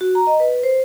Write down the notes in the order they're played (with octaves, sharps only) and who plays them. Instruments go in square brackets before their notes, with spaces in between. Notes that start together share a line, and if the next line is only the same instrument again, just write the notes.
[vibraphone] F#4
A#5
D#5
B4
C5